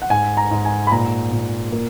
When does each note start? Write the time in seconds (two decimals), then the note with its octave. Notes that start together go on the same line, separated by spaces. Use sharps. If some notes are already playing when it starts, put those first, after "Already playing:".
0.02 F#5
0.10 G#2 G#5
0.37 A#5
0.51 G#2
0.65 G#5
0.87 B5
0.92 A#2 A#5
1.32 A#2
1.72 A#3